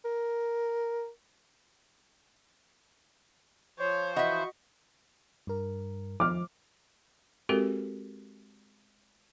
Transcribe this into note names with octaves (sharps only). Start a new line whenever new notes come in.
A#4
F3 C5 C#5
E3 F#4 D#5 E5 C#6
G2 A#4
F3 D6 F6
G#3 C4 F#4 G4 A4 A#4